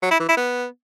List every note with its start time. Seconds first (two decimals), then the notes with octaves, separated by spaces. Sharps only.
0.02 F#3
0.11 E4
0.20 E3
0.28 E4
0.37 B3